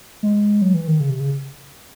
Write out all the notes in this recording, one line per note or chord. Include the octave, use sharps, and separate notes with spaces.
G#3
F#3
E3
D#3
C#3
C3
C#3